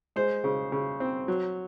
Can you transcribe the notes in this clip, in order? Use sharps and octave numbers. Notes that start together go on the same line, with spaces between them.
G#3 C5
C#3
C#3
C4
F#3